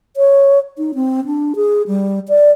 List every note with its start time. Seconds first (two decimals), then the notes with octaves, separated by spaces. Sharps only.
0.17 C#5
0.78 D#4
0.95 C4
1.25 D4
1.56 G#4
1.87 G3
2.29 D5